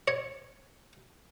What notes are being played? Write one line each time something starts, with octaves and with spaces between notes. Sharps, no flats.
C#5